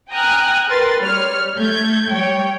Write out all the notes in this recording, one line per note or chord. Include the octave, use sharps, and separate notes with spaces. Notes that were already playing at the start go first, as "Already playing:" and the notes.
G5 G#5 A#5 D#6 F6 F#6
A#4 B4 C6 A6
G3 C#5 F6
A3 G6 G#6
G3 C#5 G5